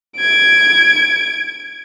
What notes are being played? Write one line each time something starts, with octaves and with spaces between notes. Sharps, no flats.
G#6 D7